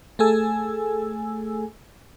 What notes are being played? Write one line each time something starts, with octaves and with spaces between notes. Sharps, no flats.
A3 G#4 A4 G#5 E6